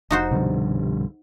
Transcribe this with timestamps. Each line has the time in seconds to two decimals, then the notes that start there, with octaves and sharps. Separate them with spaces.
0.11 F1 D#4 F#4 C5
0.31 C2 G2 B2 D3 F3